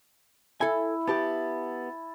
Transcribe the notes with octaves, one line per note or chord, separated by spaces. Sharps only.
E4 A4 G#5
B3 G4 A5